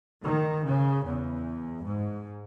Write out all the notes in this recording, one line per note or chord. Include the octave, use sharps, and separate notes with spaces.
D#3
C#3
E2
G#2